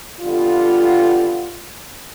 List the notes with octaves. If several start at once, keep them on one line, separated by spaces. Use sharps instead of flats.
F2 D3 G3 B3 F4